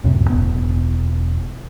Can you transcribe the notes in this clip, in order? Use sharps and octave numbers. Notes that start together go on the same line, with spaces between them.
C#2 F#2 A2 C3
E1 B3